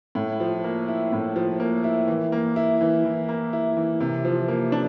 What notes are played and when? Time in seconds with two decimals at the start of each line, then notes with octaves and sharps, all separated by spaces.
0.15 A2
0.40 F3
0.64 A#3
0.88 E4
1.12 A2
1.36 F3
1.60 A#3
1.84 E4
2.08 E3
2.32 A#3
2.56 E4
2.81 E3
3.05 E3
3.29 A#3
3.53 E4
3.77 E3
4.00 C3
4.25 F3
4.48 A#3
4.72 D4